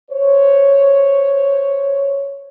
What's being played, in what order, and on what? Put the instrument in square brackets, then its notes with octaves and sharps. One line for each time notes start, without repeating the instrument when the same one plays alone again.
[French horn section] C5 C#5